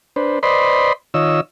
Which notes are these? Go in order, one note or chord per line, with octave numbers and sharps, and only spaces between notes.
D4 B4 C5
B4 C5 D5 D#5 B5 C6
D#3 F4 C#5 D#5 E6